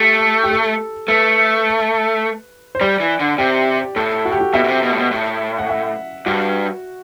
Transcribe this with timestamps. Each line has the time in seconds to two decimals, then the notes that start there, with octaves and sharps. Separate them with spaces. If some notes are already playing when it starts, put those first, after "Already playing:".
Already playing: A3 G4
0.43 G4
0.51 A4
1.08 A3 B4
2.75 C5
2.81 G3 D5
3.00 E3
3.20 D3
3.38 C3 G4
3.96 A2 A4
4.25 F#4
4.32 G4
4.41 F#4
4.53 B2 E5
4.64 B2
4.68 C3
4.83 B2
4.91 A2
4.97 B2
5.11 A2
5.58 F#5
5.69 E5
6.26 G2 F#4